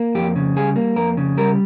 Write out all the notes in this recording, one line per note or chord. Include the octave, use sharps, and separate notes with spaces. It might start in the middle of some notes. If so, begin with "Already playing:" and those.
Already playing: A#3
F2 G4
C#3
G3 G#4
A#3
F2 A#4
C#3
G3 A#4